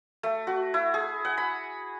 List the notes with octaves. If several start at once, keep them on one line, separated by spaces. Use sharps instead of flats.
A3
F#4
E4
G#4
F#5
B5